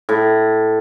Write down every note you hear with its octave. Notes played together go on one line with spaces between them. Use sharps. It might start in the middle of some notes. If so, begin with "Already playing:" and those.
A2